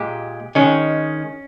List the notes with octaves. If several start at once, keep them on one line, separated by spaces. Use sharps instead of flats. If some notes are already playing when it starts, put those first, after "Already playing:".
Already playing: A#2 G#3 G4
D#3 G#3 C#4